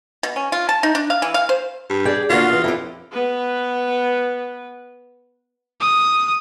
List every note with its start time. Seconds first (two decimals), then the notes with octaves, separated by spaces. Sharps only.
0.23 B2
0.36 C#4
0.52 F4
0.69 A5
0.83 D#4
0.95 D4
1.10 F5
1.22 E3
1.34 F5
1.49 C5
1.90 G2
2.05 G#4 D5 G5
2.30 D3 A#3 F4 F#4
2.49 E2 E3
2.64 F2 E4 G4
3.12 B3 B4
5.81 D#6